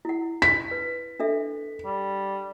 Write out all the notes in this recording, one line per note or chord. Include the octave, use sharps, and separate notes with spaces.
E4 F#5
F5 B6
B4
D4 A4 E5
G3